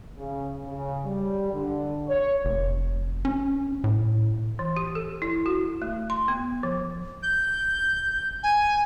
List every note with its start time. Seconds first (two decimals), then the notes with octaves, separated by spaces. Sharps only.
0.18 C#3
0.65 C#3
1.04 G3
1.51 D3
2.08 C#5
2.45 F1
3.25 C#4
3.84 A2
4.59 E3
4.77 G4
4.95 A4
5.22 E4
5.46 F#4
5.82 A3
6.10 C6
6.28 B3
6.63 F3
7.23 G6
8.43 G#5